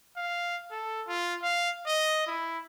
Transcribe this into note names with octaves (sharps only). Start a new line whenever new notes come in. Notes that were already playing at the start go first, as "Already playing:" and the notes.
F5
A4
F4
F5
D#5
E4